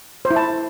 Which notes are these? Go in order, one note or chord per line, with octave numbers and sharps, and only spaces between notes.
C5
E4
A5